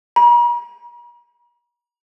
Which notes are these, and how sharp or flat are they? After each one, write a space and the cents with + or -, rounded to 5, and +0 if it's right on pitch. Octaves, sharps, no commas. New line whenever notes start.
A#5 +45